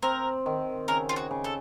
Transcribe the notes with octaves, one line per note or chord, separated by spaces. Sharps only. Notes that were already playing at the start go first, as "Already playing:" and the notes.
C4 A#4
D#3
C#3 A#4
F4
F#4
C#3
A4